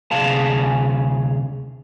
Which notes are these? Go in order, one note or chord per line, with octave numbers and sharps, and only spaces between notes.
D2 C3 G#4 F5 A5